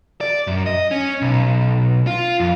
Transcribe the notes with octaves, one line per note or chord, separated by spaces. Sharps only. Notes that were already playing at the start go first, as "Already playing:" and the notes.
D5
F#2
D#5
C#4
B1
F4
F2